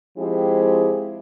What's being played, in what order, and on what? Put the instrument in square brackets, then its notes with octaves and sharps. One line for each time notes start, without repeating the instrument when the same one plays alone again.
[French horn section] F3 G#3 C4 E4 G4